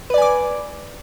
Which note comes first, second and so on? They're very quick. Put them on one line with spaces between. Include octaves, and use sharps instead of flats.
B4 D5 G#5 D6